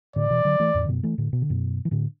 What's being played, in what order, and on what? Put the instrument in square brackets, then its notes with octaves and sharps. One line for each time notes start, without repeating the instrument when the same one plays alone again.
[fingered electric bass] A2 D3 [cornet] D5
[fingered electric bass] B2 E3
D3 F#3
E3 A3
E2 A2
D3
F#2 B2
E3 A3
A2 D3
B2
D3
F#2 B2
E3
A2 D3